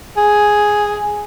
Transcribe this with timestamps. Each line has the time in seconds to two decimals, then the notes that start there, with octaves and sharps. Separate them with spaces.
0.17 G#4